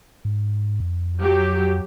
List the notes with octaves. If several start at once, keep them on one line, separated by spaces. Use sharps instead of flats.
G#2
F2
F#3 G4